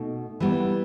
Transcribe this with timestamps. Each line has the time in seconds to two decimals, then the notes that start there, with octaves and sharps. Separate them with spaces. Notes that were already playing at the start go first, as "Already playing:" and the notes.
Already playing: B2 A3 D#4
0.40 E3 G3 B3